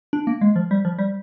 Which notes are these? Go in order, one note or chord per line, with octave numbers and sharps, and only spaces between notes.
D4
A#3
G#3
F3
G3
F3
G3